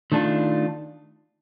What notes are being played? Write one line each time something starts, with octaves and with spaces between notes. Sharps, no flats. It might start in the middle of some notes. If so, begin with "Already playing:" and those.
D#3 A3 D4 F4